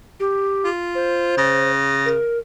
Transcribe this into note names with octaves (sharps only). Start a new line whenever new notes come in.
G4
F4
C5
C#3 A6 A#6
A#4